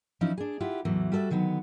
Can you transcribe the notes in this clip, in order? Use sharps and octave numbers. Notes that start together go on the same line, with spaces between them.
E3 F3 C#4 D#4 E4
D4 G#4
E4 F4 G4 E5 F#5
E2 A2 E3 F#3
G3 F#4 A4 C5 E5
D3 D#3 F#3 B3